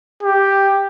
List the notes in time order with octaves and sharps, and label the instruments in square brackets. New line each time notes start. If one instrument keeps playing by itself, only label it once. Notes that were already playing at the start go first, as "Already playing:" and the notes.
[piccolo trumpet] G4